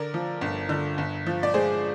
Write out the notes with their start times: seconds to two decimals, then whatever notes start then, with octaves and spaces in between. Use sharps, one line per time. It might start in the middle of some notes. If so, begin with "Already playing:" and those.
Already playing: D3 A#4 D5
0.14 F3
0.41 G1
0.69 D3
0.98 G1
1.26 F3
1.43 D5
1.54 G#3 G#4 C5